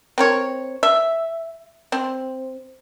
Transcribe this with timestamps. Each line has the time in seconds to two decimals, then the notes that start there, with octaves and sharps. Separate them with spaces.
0.18 C4 A#4 C#5
0.83 E5
1.92 C4